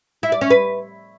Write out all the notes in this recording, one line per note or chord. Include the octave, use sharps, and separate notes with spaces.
E4
D5
C#4
B4